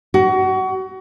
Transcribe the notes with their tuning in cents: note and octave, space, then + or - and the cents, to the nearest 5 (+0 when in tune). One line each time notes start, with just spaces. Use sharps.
F#4 +25